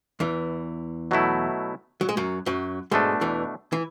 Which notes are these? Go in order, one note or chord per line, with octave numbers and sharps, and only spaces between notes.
E2 E3
B2 F#3 A3 E4
F#3
G#3
F#2 F#3
F#2 F#3
G#2 B2 G#3 A3 D4
E2 E3
E3